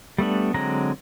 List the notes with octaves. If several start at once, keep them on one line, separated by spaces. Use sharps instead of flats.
G3 A3 B3 D4
D3 F#3 G#3 C4 A#5